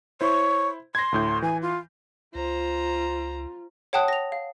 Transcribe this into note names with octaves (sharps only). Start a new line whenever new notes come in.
E4 C5 C#5
C6 G#6 A#6
D2 A2 G6
E3 G#5
F4
C#2 F4 C5 A#5
C#5 F#5 G5 A5 D#6 F#6
A#6 F7
F5